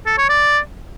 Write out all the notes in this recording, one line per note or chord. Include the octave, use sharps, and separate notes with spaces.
A4
C#5
D5